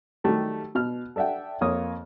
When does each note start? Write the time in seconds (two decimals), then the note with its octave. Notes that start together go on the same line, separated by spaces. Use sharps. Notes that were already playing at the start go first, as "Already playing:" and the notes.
0.24 D#3 F#3 G3 A3 G4 A4
0.75 B2 F6
1.16 A4 D5 E5 F#5 G5
1.61 F2 A#3 C#5 D#6